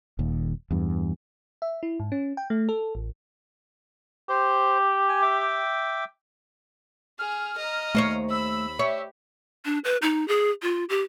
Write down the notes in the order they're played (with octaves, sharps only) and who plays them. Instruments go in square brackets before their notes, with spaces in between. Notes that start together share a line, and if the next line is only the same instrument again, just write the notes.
[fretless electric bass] D#1 D#2
E2 G2
[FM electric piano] E5
E4
G#2
C#4
G5
A3
A4
A1
[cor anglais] G4 [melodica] C5
[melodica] G#5
E5 G5 D6
[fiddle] G#4 [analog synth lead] F6
[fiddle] D#5 A#5
[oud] D#2 C5 C#5 [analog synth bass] A3
[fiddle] B5 [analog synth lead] E6
[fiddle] G4 [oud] C#5 [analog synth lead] E5
[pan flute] D4
B4
D#4
G#4
F4
G4